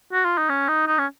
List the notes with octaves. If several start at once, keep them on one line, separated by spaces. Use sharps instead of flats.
F#4
F4
D#4
C#4
D#4
D#4
C#4